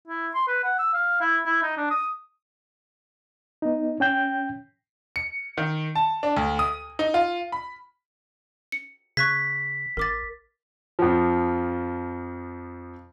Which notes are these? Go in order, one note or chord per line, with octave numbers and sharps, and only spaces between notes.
E4
C6
B4
F#5
E6
F5
E4
E4
D#4
D4
D#6
B3 D#4
C#4 G5 G6
C#7
D#3
A5
D4
D2
D#6
D#4
F4
B5
C#7
C#3 C#6 F#6 G#6 B6
A1 A#4 D6 A6
F2 F3